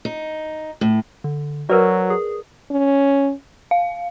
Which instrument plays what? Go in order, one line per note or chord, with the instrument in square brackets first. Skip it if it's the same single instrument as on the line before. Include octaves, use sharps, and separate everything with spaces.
[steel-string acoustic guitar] D#4
A2
[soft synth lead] D3
[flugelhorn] F#3 [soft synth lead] F#4 [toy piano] A#4 B4 D5
[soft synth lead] G#4
[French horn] C#4
[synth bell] F5